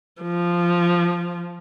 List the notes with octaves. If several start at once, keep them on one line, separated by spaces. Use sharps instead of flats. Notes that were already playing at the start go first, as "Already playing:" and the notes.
F3